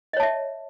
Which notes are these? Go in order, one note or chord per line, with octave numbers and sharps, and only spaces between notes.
C#5 D#5 E5 A5